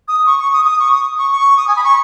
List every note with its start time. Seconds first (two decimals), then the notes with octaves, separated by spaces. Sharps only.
0.08 D#6
0.26 C#6
0.39 C#6
0.53 D#6
0.65 D#6
0.79 C#6
0.91 D#6
1.18 C#6
1.31 C#6
1.57 D#6
1.68 G#5
1.76 B5
1.84 C#6